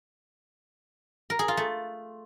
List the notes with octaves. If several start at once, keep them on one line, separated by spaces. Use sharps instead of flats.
A#4
G#4
F4
A3